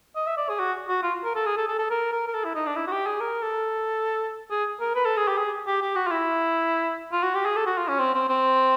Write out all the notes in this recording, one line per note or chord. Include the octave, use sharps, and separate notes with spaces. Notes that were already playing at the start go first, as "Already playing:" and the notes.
D#5
E5
D5
G#4
F#4
F#4
F4
A#4
A4
G#4
A4
A4
A4
A#4
A#4
A#4
A4
E4
D#4
D4
E4
F#4
G4
G#4
A#4
A4
G#4
A#4
B4
A4
G#4
G4
G#4
G4
G4
F#4
F4
E4
F4
F#4
G4
G#4
A4
F#4
F4
C#4
C4
C4
C4